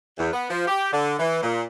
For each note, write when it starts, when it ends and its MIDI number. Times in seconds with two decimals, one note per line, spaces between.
0.18 0.31 40
0.33 0.50 59
0.50 0.67 53
0.68 0.88 67
0.93 1.15 50
1.19 1.41 52
1.43 1.64 46